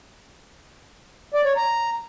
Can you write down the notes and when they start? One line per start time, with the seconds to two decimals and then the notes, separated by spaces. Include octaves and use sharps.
1.34 D5
1.45 C#5
1.56 A#5